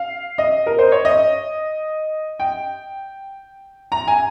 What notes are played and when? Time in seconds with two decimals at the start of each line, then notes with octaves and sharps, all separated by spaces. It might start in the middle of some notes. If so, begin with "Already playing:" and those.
Already playing: F5
0.38 D#5
0.66 A#4
0.79 C5
0.92 C#5
1.05 D#5
2.40 G5
3.92 A#5
4.07 G#5